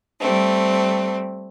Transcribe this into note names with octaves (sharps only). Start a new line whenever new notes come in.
G3 A3 C4